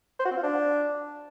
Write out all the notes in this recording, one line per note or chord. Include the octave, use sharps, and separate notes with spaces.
C5
F#4
C4
F4
D4